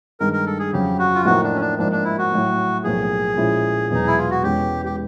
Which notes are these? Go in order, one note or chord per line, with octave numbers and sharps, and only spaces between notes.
G2 D#3 G#3 A#4
A#4
A4
G#4
F2 C#3 F#3 G4
F#4
F4
A2 F3 A#3 D#4 F#4
D4
C#4
D4
G#2 F3 A#3 D4 D#4
D4
E4
F#4
A2 F#3 A3
B1 A2 F3 A#3 G#4
A#2 F3 G#3 C#4 E4
E1 E2 B2 F#3 B3 D#4
E4
F4
F#4
E1 E2 B2 G#3 C#4 G4
G4